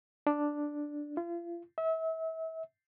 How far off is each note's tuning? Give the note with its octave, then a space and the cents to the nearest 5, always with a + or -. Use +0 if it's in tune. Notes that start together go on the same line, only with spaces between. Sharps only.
D4 +0
F4 -35
E5 -35